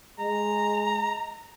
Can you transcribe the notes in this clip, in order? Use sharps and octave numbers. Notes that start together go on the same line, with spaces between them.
G#3 A#5